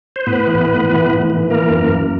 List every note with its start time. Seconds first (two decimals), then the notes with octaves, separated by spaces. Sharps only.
0.16 C5
0.27 A2 B3 B4
0.47 E3
0.68 A2
0.89 E3
1.09 A2
1.30 E3
1.50 E3 A#3 A#4
1.70 F#2
1.92 F#2